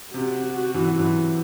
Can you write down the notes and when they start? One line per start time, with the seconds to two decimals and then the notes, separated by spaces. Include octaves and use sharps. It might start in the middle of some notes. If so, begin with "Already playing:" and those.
0.14 C3 F#4
0.75 E3
0.86 F#3
0.99 E3